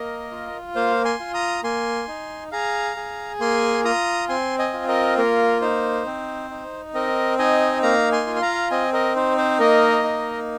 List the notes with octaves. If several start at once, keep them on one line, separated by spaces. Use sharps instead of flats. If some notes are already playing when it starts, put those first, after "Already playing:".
Already playing: A#3 A#4 D#5
F4
A#3 C5 F5
G#5 C6
F4
A#5 D#6
A#3 G#5 C6
D#4
G#4 F5 A#5
G#4
A#3 G#5 C6
F4 A#5 D#6
C4 G#5 C6
D#5 G#5
F4
A#4 D#5
A#3 A#4
D#4 C5
C4
D#4
C4 A#4 D#5
D#4 D#5 G#5
A#3 F5 A#5
G#5 C6
F4
C6
F5 A#5
C4 D#5 G#5
A#4 D#5
D#4 C5
C5
A#3 A#4 D#5
D#4